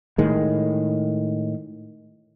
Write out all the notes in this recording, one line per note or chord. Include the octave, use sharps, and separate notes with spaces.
A2 D#3 G#3